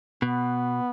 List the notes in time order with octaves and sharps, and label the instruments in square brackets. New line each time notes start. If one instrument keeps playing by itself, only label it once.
[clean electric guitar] B2 [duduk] B3